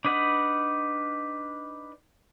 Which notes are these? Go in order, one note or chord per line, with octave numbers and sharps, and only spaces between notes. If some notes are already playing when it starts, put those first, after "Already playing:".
D4 D#4 B4 F#5